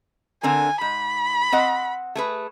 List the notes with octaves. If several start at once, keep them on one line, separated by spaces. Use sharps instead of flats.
D3 C4 A#4 G#5
G#2 B5
C4 D#5 F#5
A3 G#4 B4